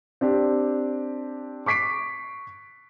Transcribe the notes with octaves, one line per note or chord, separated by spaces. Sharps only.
C4 D4 G4
C#6 D6 B6 C7 D7